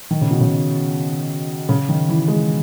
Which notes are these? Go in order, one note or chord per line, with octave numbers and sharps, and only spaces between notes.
D#3
C#3
B2
C#3
C#3
D#3
E3
G#3